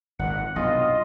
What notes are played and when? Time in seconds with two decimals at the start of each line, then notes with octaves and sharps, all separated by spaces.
0.19 G#1 A#2 F#5
0.56 B1 G2 C3 F4 D#5